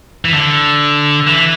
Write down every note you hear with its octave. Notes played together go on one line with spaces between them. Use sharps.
E3
D3
E3